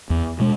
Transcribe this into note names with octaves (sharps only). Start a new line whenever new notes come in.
E2
B2 G#3